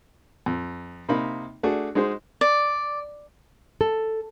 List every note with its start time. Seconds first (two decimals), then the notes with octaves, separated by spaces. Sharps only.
0.46 F2
1.09 C3 A#3 D#4 B5
1.63 A3 D4 F#4 G#4
1.95 G#3 D#4 F#4 G#4 C5
2.41 D5
3.81 A4